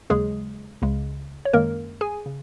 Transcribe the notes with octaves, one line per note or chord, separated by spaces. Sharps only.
D#2 C#3 F#3 G#3 G#4
C#2 C#3 G#3
C#5
F#2 D#3 G#3 A#3 A#4
G#4 G#5
C#3